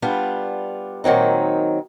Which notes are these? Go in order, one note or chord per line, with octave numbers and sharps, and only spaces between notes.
G3 B3 D4 F4
A#2 D#3 F#3 C4 D#4